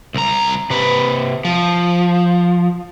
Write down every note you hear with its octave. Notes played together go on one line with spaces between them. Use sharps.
C2 A#5
C3 B4
F3